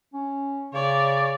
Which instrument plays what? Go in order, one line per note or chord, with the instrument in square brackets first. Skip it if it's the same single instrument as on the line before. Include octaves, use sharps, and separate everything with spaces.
[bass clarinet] C#4
[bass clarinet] C#3 [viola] C#5 D5